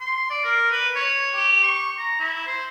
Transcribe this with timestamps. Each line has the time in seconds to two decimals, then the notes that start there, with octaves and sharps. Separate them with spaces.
0.01 C6
0.30 D5
0.44 A#4
0.71 B4
0.96 C#5
1.35 G4
1.63 C#6
1.99 A#5
2.20 E4
2.47 C5